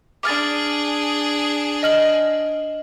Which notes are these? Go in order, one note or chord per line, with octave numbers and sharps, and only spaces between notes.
D4 G#4 D6 F6 A6
D#5 F6 F#7